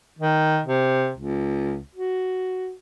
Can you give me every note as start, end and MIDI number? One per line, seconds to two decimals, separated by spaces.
0.19 0.60 51
0.65 1.12 48
1.18 1.79 37
1.95 2.72 66